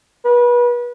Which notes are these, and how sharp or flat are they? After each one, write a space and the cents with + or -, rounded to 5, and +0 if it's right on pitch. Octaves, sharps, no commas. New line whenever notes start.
B4 -30